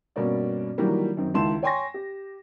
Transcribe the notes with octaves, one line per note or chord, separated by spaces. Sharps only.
G2 B2 A#3 C#4 D5
D#3 E3 F#3 G3 A#3 D4
F#2 D#3 C4
C#2 D#3 E4 A5 C6 E7
C#5 G5 G#5 C6 C#6 A#6
G4